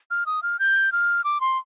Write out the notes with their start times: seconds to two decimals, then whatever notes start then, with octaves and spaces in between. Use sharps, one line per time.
0.11 F6
0.26 D#6
0.43 F6
0.59 G6
0.92 F6
1.24 D6
1.41 C6